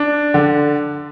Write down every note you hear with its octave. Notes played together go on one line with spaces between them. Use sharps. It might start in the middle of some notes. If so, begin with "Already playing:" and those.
Already playing: D4
D3